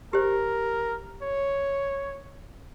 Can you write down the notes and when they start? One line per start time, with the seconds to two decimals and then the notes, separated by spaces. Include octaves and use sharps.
0.13 G4 A#4 C5
1.22 C#5